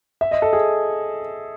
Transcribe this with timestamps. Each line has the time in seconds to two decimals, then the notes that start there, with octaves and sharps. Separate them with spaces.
0.21 E5
0.31 D#5
0.42 A4
0.53 G#4